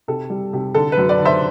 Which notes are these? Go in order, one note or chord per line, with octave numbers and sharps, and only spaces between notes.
C3 A4
G3
C3
D3 A4
B4
F#2
B4 D5
D3
C5 E5